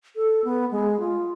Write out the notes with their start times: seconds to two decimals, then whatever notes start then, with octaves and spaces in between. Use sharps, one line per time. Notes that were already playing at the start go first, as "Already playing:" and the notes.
0.16 A4
0.44 B3
0.71 G#3
1.00 F4